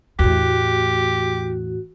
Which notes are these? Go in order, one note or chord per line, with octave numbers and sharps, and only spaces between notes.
E2 A2 F#4 G4